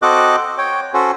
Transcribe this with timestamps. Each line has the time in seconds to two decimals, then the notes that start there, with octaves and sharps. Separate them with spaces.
0.02 C4 F#4 A4 D#5 D6 F#6
0.58 C#5 G5
0.94 C#4 F#4 A4 C5